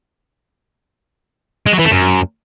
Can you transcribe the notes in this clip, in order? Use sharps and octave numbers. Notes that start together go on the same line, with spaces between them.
G#3
F#3
E3
A3
F#2